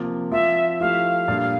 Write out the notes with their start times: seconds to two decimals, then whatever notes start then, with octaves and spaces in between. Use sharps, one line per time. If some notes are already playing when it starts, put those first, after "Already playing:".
Already playing: C3 F3 A#3
0.31 F3 C4 F4 E5
0.80 F3 A3 E4 G4 F5
1.28 A#2 G3 D4